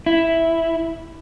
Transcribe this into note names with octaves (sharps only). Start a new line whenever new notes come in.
E4